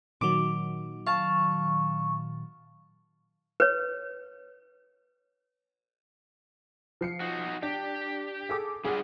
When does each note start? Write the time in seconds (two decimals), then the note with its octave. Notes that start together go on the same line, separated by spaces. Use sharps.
0.21 A#2 D#3 F#3 D6
1.06 F5 A5 C#6
3.60 B4 C#5
7.01 F3 C7 C#7
7.20 D#4 F#4
7.63 D4 G4
8.49 G#4 A4 D6
8.84 G3 D4 F4 G#4 F#5